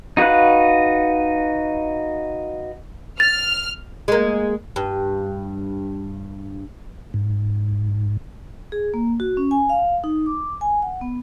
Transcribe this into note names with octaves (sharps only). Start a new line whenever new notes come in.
D#4 F#4 B4 F5 F#6
F6 A6
G#3 A#3
G2
G#2
G#4
A#3
F#4
C#4
G#5
F5
D#4
D6
G#5
F#5
B3